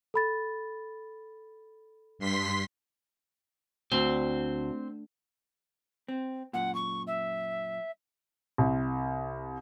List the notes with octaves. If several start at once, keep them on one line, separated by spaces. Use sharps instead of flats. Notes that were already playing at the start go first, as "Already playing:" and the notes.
A4 B5 A6
G2 C6 B6
D2 C4 C5
C4
F#2 A#2 F#5
C#6
E5
C2